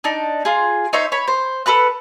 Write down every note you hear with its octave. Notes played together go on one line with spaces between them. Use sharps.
D4 D#4
F4 G#4
D#4 C5 C#5 E5
C#5 B5
C5
A4 B4 B5 F#6